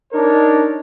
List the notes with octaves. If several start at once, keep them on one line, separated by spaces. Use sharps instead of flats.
D4 D#4 A#4 C#5